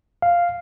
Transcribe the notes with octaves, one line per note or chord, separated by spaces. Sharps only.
F5